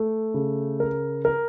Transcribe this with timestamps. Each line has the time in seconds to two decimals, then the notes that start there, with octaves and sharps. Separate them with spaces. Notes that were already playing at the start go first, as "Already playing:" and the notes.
Already playing: A3
0.34 C#3
0.80 A#4
1.25 A#4